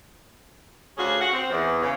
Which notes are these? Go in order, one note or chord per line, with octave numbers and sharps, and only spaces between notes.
D2 C#4 F#4 G#4 F5
F#4 F#5
C4
E2
C#3